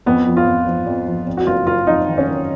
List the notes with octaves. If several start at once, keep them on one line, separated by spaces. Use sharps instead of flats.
F2 B3
F3
F4
F2
F3
F2
F3
F2
F#4
F#1 F4
F#1 F4
F2 D#4
D#3
C#4
F#1